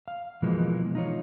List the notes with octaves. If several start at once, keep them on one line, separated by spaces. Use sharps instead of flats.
F5
B2 E3 F3 G#3 A#3
D#4 F4 C#5